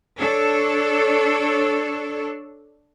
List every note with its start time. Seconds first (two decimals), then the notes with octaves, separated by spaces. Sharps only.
0.18 D4 A4 C#5